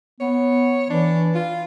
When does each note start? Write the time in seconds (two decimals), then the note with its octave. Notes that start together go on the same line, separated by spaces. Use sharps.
0.20 B3 C#5
0.90 E3 D4
1.35 F4